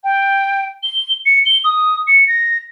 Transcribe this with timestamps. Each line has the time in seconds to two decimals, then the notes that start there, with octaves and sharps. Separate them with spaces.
0.04 G5
0.83 G7
1.26 C#7
1.46 G7
1.64 D#6
2.07 C#7
2.28 A#6